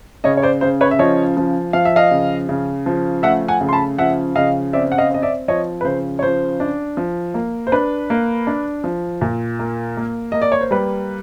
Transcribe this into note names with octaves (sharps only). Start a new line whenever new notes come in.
C#3 C#5 D#5
C#5
C5 D5
C#3 C5
B4 C#5
E5
F3 C#5 D#5
F3
F3 F5
E5
D#5 F5
C#3
C#3
F3
A3 E5 F#5
F#5 G#5
C#3
C6
A5 B5
F3 E5 F#5
C#3 D#5 F5
C4 D5 E5
F#5
D#5 F5
C4 D#5
D5 E5
F3 C#5 D#5
B4
C#3 C5
C#5
F3 C5
D4
F3
A#3
C5
D4 B4
A#3
D4
F3
A#2
A#3
A#3
A#3 D#5
D5
C#5
C5
G3 B4